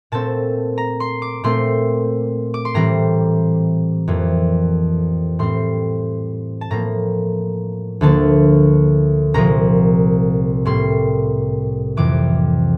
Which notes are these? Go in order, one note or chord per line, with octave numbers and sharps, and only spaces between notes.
A#2 A3 C4 A5
A#5
C6
D6
A#2 A3 C4 C6
D6
C6
A2 E3 G3 C4 A#5
F2 E3 A#3
A2 G3 C4 C6
A5
A2 F3 A#3 A#5
D2 D3 F3 A#3 A5
C2 A#2 F3 A#5
A2 G3 A#3 C6
F2 C3 E3 D6